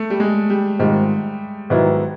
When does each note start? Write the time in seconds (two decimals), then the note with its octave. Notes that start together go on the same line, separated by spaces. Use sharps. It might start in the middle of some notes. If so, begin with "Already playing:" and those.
Already playing: A3
0.10 G3
0.20 G#3
0.50 G3
0.79 G#2 D#3 G3 G#3 C4 F4
1.70 G#2 D#3 F#3 B3 E4